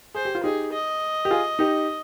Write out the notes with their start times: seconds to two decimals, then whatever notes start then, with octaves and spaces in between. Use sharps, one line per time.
0.15 G#4 C5
0.25 G4
0.35 F4
0.44 D#4 G4 G#4
0.73 D#5
1.25 G4
1.31 F4 G#4
1.59 D#4 G4